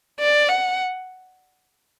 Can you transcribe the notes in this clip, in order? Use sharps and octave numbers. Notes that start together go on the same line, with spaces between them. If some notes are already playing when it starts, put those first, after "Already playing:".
D5
F#5